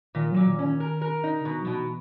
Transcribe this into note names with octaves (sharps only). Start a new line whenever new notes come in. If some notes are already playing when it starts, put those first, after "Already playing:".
A#2 D#3
A#2 F#3
D#3
C#4
D#3
A#4
A#4
D#4
C#3
B2 D#3
F#3
B2 E3